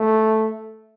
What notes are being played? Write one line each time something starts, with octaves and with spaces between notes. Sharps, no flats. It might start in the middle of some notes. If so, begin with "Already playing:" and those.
Already playing: A3